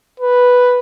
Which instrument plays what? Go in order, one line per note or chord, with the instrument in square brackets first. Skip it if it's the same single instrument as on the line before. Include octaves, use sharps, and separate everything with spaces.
[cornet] B4